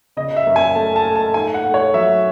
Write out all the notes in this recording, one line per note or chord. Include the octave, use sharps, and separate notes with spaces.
C#3 D#5
E5
F#2
G#5
A3 A5
A5
A3
A5
G#2 G#5
F#5
A3
C#5
F#3 E5